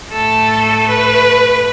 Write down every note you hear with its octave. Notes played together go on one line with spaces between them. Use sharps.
A2 A3 A4
B4